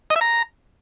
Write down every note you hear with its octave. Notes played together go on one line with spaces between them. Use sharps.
D#5
E5
A#5